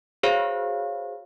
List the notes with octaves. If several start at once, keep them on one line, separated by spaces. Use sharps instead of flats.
F#4 G#4 C5 C#5 F5